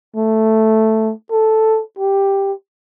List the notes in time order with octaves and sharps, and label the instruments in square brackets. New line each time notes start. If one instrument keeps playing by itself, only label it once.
[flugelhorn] A3
A4
G4